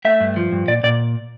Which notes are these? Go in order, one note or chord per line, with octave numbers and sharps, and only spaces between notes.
A3 E5
G2
F3
G2
A#2 D5
A#2 D5